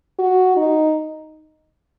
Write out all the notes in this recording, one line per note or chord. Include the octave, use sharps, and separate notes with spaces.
F#4
D#4